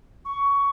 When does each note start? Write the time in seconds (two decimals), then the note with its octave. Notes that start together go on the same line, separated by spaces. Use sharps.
0.25 C#6